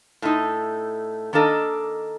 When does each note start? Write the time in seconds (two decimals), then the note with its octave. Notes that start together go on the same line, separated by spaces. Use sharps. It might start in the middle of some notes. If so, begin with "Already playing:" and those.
0.22 A2 A3 D#4
1.33 D#3 A#3 D4 A4 D#5